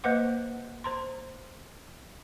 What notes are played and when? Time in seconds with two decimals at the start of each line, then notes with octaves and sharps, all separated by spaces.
0.04 A#3 B4 C5 D#5 F#5 D6
0.84 C5 A#5 C6